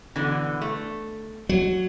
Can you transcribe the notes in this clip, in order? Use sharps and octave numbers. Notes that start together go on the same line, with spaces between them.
B2 D3 E3
A3
F#3